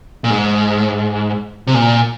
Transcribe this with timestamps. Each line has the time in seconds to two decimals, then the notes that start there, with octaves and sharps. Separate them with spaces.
0.24 A#2
0.30 G#2
1.67 C3
1.74 A#2